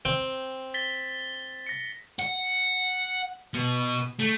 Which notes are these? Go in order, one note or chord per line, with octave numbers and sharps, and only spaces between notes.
C4 G5
A6 B6 G7
A#6 C#7
F#5
B2
A3